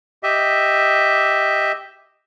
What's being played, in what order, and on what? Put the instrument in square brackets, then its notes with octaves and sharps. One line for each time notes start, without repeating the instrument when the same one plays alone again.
[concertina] G4 D#5 E5